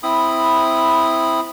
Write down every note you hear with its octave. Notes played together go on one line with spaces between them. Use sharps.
C4 E4 B5 D#6